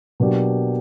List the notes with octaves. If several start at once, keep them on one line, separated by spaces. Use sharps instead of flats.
B2 F#3 A#3 D4 G4